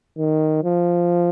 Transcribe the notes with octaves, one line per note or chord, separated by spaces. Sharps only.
D#3
F3